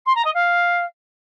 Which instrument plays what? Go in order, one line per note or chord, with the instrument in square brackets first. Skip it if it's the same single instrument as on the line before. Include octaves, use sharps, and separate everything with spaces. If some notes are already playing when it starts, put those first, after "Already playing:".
[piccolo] C6
A#5
D#5
F5